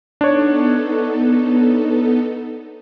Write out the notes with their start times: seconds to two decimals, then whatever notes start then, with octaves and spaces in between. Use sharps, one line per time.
0.21 B3 D4 D#4 A4 C#5